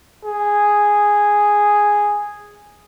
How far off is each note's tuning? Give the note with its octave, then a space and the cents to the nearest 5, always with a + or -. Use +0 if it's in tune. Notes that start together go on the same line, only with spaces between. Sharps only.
G#4 -5